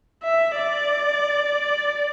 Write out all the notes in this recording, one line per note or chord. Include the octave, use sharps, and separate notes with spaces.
E5
D5